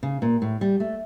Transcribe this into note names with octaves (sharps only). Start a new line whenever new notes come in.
C#3
A#2
A2
G3
A3